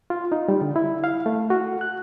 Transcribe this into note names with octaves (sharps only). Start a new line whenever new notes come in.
F4
D#4
G3
D3
E4
F5
A3
F#4
F#6